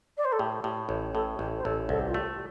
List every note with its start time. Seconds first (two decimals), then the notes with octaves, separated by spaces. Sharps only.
0.17 D5
0.24 C5
0.32 A4
0.39 A2 G4
0.64 A2 G4
0.89 A1
1.14 A2 A4
1.39 A1 G4
1.57 C5
1.64 A1 A4
1.89 C2 A4
1.99 G4
2.08 F4
2.14 A3 G4